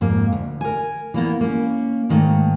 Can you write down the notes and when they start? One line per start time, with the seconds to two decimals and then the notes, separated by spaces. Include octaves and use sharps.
0.01 F2 G#2 A#3
0.32 D2
0.61 A#4 G#5
1.14 E3 A#3 B3
1.41 A#3 C#4
2.09 G#2 D#3 A3 A#3